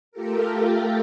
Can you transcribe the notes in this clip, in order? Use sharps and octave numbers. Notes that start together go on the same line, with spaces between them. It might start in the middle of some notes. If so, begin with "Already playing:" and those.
A3 F4 G4 A4 A#4